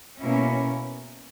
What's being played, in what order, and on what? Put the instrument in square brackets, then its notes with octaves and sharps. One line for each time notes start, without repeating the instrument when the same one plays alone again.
[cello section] B2 A#3 C#4 E4